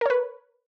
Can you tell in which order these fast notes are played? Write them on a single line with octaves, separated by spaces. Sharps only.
A#4 C#5 B4